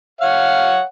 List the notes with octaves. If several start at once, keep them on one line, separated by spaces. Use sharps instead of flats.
C#5 F5 F#5